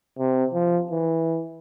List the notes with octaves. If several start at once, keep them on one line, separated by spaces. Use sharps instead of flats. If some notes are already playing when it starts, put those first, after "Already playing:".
C3
F3
E3